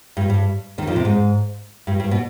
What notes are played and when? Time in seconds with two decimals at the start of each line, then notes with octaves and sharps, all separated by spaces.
0.17 G2
0.30 G2
0.78 D#2 D#3
0.87 F2 F3
0.96 C3
1.05 G#2
1.87 G2
2.00 G2
2.11 B2